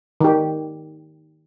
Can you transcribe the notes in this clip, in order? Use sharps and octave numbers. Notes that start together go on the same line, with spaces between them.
D#3 G4